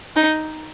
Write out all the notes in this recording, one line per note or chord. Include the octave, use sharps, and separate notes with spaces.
D#4